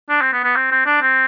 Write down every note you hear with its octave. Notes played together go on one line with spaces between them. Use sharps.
D4
C4
B3
B3
C4
C4
D4
C4